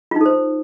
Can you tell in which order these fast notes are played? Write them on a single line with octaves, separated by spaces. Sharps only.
F4 D#4 A4 C5